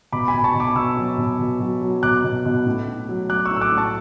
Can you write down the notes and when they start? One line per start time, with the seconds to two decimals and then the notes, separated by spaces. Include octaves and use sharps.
0.13 B2 B5 D6
0.28 G#5 B5
0.33 B2
0.44 A5 C#6
0.55 B2
0.60 B5 D6
0.76 B2 C#6 E6
0.97 F#3
1.18 B2
1.39 B2
1.60 F#3
1.81 F#3
2.03 B2 D6 F#6
2.24 B2
2.45 B2
2.67 A2
2.88 A2
3.09 F#3
3.29 F#3 D6 F#6
3.45 C#6 E6
3.51 A2
3.56 E6
3.61 D6 F#6
3.72 A2
3.77 A5 C#6